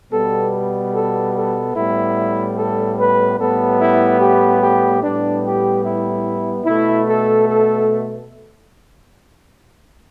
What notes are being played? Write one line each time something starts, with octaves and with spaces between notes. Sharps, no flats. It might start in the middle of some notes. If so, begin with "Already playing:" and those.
B2 G3 B3 A4
A4
A4
A2 G3 B3 E4
A4
B4
A2 G3 B3 A4
E4
G4
G4
A2 G3 B3 D4
G4
E4
B2 A3 E4
A4
A4